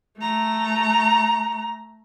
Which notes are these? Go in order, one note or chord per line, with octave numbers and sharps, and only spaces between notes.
A3 A#5